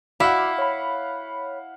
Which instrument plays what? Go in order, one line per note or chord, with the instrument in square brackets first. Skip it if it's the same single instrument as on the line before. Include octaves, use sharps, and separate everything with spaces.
[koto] E4 [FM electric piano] F#4 D5 D6 [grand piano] F5 F#5
[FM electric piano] C#5 B5